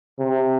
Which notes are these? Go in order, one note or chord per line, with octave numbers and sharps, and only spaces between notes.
C3